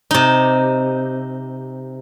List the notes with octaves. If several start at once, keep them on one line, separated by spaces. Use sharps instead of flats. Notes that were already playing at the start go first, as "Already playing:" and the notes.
C3 D#4